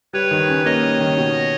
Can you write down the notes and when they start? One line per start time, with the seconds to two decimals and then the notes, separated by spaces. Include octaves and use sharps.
0.13 G3 B4 C#5
0.31 D#3
0.48 C#4
0.65 A#3 C#5 D#5
0.82 G3
1.00 D#3
1.17 B2